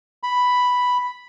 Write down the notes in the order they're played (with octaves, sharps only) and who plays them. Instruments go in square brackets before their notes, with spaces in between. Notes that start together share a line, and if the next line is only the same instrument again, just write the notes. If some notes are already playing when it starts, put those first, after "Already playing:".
[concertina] B5